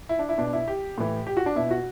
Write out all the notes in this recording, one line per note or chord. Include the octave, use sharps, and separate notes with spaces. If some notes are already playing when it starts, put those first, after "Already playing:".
E4
D4
E4
B2 D4
E4
G4
A2 E3
G4
F#4
D4
B2 E4
F#4